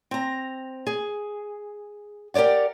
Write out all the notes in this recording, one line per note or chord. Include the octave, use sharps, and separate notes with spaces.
C4 A#5
G#4
G4 A#4 C#5 D5 F#5